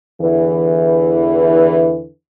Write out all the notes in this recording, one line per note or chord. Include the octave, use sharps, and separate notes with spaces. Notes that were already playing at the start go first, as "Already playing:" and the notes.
E2 D3 E3